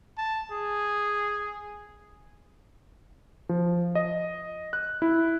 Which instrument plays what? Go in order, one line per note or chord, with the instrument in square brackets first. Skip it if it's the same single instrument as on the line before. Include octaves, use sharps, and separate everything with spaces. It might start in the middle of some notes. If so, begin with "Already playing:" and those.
[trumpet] A5
G#4
[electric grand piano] F3
D#5
F#6
E4